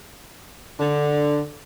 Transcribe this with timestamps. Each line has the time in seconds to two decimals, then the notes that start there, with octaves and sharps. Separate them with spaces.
0.80 D3